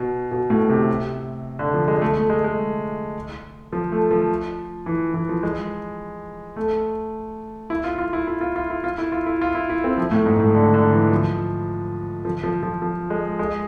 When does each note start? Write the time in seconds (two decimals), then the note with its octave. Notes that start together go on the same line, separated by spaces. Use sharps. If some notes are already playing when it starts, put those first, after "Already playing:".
Already playing: B2
0.31 B2
0.50 A2
0.69 C3
1.59 D3
1.74 F3
1.88 G#3
2.01 A3
2.16 A3
2.30 G#3
2.44 G#3
3.73 F3
3.92 A3
4.11 F3
4.86 E3
5.14 E3
5.29 F3
5.43 G#3
6.56 A3
7.70 E4
7.84 F4
7.98 F4
8.13 E4
8.27 E4
8.41 F4
8.56 F4
8.70 E4
8.84 F4
8.98 E4
9.12 F4
9.26 E4
9.41 F4
9.55 E4
9.70 E4
9.84 C4
9.98 F3
10.11 A2
10.26 G#2
10.40 A2
10.55 D3
10.74 D3
10.93 E3
11.11 F3
12.25 F3
12.43 F3
12.63 F3
12.82 F3
13.10 G#3
13.39 G#3